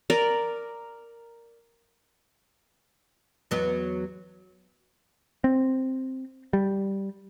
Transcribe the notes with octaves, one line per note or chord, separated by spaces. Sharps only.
A#4 D5
E2 F#3 B3
C4
G3